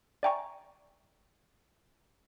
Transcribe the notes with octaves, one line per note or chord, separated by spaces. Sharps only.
D5 E5 G5 G#5 A#5 C#6